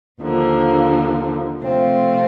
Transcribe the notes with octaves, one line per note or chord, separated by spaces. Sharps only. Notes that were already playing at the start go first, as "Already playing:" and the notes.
D#2 D3 F3 A#3
C3 F3 A3 C4 F4